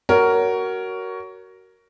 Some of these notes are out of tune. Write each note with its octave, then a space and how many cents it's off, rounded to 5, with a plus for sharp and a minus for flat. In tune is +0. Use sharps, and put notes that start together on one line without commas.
F#4 +20 A#4 +0 C#5 +15